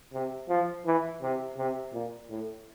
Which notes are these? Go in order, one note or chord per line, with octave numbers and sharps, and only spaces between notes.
C3
F3
E3
C3
C3
A#2
A2